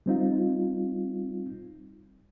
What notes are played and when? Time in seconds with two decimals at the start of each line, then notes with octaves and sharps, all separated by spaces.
0.06 G3 C4 D#4 F4